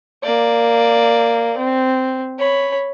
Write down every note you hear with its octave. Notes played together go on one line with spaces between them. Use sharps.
A#3 D5
C4
C#5 B5